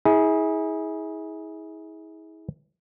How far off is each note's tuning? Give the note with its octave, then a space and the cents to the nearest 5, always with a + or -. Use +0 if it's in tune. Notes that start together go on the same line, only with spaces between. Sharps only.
E4 -40 G#4 +0